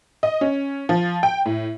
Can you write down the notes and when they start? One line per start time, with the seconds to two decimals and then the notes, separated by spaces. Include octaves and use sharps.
0.23 D#5
0.41 C#4
0.89 F3
1.23 G5
1.46 A2